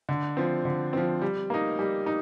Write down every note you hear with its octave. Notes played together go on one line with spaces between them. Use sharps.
D3
F3 C4
D3
F3 C4
G3
A#3 D#4
G3
D#4